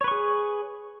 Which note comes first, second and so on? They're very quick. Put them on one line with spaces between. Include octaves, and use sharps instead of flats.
C#5 B4 C#6 G#4